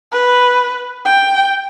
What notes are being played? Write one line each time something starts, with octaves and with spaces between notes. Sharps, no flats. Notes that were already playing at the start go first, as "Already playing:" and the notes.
B4
G5